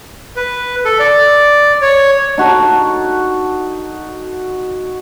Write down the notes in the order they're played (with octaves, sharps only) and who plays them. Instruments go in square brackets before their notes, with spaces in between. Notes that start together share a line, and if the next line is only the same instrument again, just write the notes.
[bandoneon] B4
A4
D5
C#5
[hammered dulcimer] D#4 F#4 A4